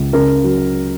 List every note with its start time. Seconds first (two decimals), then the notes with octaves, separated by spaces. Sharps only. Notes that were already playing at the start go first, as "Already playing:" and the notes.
Already playing: C#2
0.13 C#3 A#4
0.44 F#3